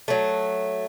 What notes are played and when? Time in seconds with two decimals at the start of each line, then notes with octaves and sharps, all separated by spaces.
0.08 F#3 A3